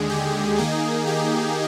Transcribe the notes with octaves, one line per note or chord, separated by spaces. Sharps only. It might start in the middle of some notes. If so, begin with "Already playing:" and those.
Already playing: D#2 D3 G#3 G#4
G4
D#3 A#3 D#4 G#4
G4